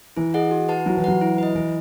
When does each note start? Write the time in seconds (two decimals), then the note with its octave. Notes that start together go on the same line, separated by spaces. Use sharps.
0.17 E3 E4
0.34 G#4 D#5 F#5
0.51 F#4
0.69 B4 F#5 A5
0.86 F#3 E4
0.97 E3
1.04 F#3 B4 F#5
1.21 E4
1.38 B4 D#5
1.55 E3 E4